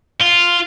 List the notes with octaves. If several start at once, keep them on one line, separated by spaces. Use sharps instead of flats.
F4